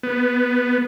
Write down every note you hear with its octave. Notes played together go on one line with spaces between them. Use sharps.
B3